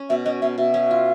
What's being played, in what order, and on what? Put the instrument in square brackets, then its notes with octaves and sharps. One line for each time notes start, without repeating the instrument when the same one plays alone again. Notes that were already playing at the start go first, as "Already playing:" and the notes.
Already playing: [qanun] C#4
[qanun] B2 [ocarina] E5
[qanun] C#4 [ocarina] D#5
[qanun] B2 [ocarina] E5
[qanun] B2 [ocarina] E5
[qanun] C#4
F4